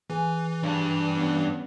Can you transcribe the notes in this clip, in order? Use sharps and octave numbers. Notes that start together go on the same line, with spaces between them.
E3 G#4 G#5
G2 A5
G3 B3 C#4